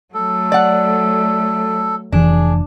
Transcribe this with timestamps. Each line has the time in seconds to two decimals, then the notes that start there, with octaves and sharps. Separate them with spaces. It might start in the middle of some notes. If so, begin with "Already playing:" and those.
0.14 F#3 A3 A4
0.52 D5 F#5
2.12 F1 E3 D4 G#4